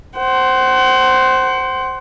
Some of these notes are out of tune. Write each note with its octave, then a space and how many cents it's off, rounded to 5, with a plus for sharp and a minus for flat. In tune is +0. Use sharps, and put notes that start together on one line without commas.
C5 +0 F#5 +35